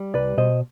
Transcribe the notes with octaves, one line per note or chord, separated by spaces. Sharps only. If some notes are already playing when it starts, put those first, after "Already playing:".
Already playing: G3
C2 B4 D5
B2 C5 D#5